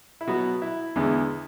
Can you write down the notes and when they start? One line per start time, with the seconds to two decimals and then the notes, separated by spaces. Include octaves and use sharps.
0.21 E4
0.28 B2 F#3 B3 F#4
0.62 E4
0.96 E2 D3 G#3 B3